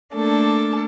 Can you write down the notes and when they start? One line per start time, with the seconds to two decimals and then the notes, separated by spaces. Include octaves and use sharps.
0.13 A3 A#3 D4 A4